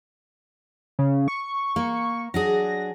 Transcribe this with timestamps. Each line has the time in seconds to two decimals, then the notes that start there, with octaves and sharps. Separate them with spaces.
0.99 C#3
1.28 C#6
1.76 A#3
2.34 F#3 D4 G#4 A#6